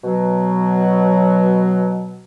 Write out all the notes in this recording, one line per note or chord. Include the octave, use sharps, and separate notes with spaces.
B2 F#3